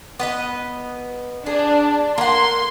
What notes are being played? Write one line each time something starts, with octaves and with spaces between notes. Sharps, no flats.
B3 B4 D#5
D4 G#4
A#3 F#5 C6